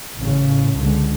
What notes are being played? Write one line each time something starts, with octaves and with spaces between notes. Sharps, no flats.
A1 C#3
C#2 D3 G#3